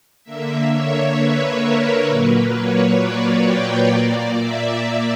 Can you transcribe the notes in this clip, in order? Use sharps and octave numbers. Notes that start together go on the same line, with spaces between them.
D3 A#3 E5
C#5
B4
A#4
A#2 F#3 A#3 B4
C#5
D5
G5
A#2 A#3 D5
E5
E5